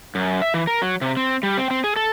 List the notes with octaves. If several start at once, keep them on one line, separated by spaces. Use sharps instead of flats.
F#2
E5
E3
A#4
F#3
C3
C4
G3
C4
C4
G#4
A4